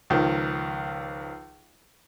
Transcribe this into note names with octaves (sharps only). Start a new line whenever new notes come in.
C#2 D#3 F3